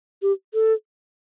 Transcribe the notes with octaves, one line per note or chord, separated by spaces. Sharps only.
G4
A4